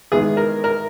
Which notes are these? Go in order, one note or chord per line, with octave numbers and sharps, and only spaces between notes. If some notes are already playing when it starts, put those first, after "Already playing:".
E2 D#3 G#3 B3 G#4
A#4
A#4